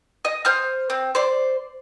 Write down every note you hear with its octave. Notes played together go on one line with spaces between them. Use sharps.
D#5
C5 D#6 F6
C4
C5 D5